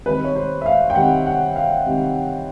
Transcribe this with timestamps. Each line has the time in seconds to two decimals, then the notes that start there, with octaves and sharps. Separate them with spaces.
0.06 C3 D#3 G3 B4
0.24 C#5
0.35 C5
0.61 E5
0.66 F5
0.90 G5
0.95 C3 D#3 G3 F#5
1.26 F#5
1.56 F5
1.86 C3 D#3 G3